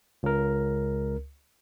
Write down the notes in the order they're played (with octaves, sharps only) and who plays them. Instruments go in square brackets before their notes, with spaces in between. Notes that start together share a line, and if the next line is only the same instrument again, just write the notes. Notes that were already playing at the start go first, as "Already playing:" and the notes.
[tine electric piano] C#2 A#4